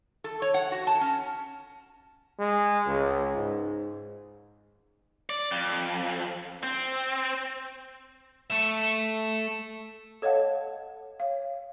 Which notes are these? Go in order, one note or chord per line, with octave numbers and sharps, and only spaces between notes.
A4
C#5
F#5
F#4
A5
C#4
G#3
C#2
G#2
D5
F2
C4
A3 E5
A4 C#5 D#5 F5 F#5 A5
C#5 F5